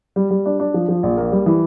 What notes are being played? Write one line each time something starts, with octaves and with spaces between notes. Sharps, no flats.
G3
G3
D4
D4
F3
F3
A#1
A#3
G3
E3